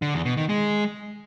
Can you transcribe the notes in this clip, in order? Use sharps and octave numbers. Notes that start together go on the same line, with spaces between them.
D3
E2
B2
D#3
G#3